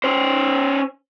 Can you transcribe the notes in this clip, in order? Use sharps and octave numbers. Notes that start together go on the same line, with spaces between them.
C#4 C5